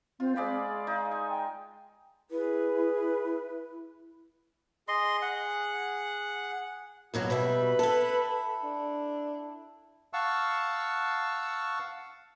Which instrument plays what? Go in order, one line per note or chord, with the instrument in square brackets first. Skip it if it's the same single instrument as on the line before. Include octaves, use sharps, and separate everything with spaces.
[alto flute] C4 [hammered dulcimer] F4
[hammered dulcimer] G#3 D5 B5 [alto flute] F5
[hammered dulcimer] D#4
G#5
[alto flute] G5
[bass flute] E4 [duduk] G#4 [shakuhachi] B4
[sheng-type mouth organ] G#4 [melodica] D#5 C6
[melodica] F#5
[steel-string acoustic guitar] D#2 B2 F#3 [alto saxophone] F#4
[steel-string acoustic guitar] B2 G3 E5 [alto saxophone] B4
[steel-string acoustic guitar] E4 A4
[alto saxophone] D4
[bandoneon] F5 F#5 A5 C#6 E6